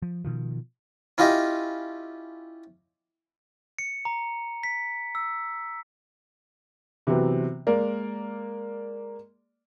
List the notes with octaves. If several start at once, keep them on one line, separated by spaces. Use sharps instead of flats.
F3
B2 D#3 F3
C#4 E4 F4 G4 D#5
C#7
A#5
B6
E6
C3 E3 F#3 B3 C4
G#3 A#3 A#4 D5